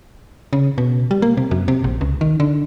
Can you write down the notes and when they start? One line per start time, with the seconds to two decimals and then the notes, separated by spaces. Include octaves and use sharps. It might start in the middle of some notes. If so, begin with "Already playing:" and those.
0.53 C#3
0.78 B2
1.11 G3
1.22 A#3
1.37 C3
1.51 F#2
1.68 C3
1.84 A#1
2.01 C#2
2.21 D#3
2.40 D3